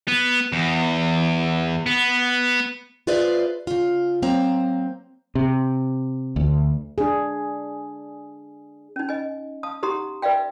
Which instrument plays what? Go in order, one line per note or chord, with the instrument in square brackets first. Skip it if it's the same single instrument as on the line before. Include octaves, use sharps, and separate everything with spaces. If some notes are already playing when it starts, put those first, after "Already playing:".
[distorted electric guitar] B3
E2
B3
[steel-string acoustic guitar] F4 G#4 B4 C5 D5 E5
C#3 F4
F#3 A#3 C4 C5 A#5
[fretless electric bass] C3
D2
[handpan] D4 G#4
[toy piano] C#4 D#4
D#5 G#5
F5 A5 D#6
D#4 G4 F#5 A#5 C6 D#6
B4 D5 E5 F5 G5